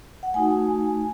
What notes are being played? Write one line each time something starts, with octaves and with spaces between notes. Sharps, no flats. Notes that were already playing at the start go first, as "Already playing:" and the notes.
F#5
A3 D#4 F#4 G#5